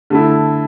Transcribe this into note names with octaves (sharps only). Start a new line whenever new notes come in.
D3 A3 E4